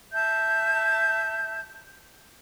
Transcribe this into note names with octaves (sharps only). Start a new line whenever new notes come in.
E5 A5 G6